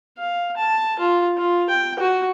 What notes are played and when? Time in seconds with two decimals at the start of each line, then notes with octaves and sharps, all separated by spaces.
0.18 F5
0.57 A5
0.99 F4
1.37 F4
1.69 G5
1.99 F#4